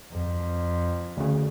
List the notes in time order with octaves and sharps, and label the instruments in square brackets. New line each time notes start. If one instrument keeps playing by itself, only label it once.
[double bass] F2
[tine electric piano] D2 C#3